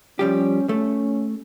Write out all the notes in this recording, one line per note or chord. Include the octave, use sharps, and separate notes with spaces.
F3 G3 C#4 G4
A3 C#4